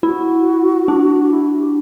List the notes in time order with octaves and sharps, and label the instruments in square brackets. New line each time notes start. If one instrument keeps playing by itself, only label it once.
[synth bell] E4 [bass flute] F#4
[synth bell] D4
[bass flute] E4
G4